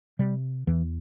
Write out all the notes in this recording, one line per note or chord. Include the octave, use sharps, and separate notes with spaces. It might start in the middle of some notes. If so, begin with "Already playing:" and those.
C3 G3
E2 E3